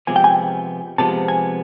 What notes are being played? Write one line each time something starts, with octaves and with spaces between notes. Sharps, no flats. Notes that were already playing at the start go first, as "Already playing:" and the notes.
C3 F3 G#3 B3 G#5
G5
G#5
C3 F3 G#3 B3 A5
G#5